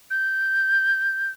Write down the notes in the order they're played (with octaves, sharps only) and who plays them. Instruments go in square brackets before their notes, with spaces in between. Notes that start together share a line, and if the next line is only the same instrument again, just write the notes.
[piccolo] G6